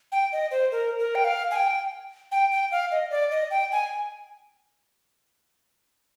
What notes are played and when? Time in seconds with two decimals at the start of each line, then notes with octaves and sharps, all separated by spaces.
0.12 G5
0.32 D#5
0.51 C5
0.71 A#4
0.99 A#4
1.15 G5
1.24 F5
1.51 G#5
1.56 G5
2.32 G5
2.51 G5
2.71 F5
2.91 D#5
3.11 D5
3.31 D#5
3.51 G5
3.72 G#5